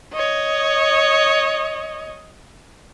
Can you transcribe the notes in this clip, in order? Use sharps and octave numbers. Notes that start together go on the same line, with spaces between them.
C#5 D#5